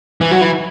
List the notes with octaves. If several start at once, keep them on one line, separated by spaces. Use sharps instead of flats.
E3
F#3
E3